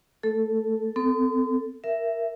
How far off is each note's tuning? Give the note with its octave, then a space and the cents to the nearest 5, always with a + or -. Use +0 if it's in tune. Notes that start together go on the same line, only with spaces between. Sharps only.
A3 +0 A4 +0
C4 -40 A4 +0
A#4 +0 E5 +10